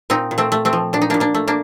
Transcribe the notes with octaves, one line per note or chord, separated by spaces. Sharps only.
A#2 C4 D#4
A#2
A3 C4
A3
A3 C4
F3
A#2 D4
D#4
A#2 A#3 D4
A#3 D4
A3
A#3 D4